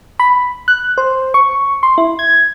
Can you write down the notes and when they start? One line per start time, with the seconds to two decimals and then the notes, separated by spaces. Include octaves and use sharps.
0.20 B5
0.68 F#6
0.98 C5
1.34 C#6
1.83 C6
1.98 E4
2.19 G#6